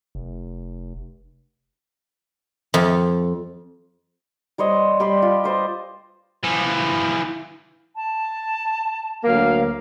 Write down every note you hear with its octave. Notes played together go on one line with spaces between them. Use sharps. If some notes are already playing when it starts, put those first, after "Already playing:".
F1
F2
G3 C5 C#5 D#5
G3 G4 B5 C6
F4
B4 C5 D5 D#5
E3 F3
A5
D2 F#3 A#3 F5